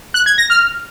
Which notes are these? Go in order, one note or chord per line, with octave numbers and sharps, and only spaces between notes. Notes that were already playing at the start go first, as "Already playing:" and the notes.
F#6
G#6
A#6
F6